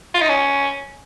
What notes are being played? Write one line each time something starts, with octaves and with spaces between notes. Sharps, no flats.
F4
D#4
C#4